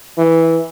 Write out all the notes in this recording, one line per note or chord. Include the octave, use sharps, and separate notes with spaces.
E3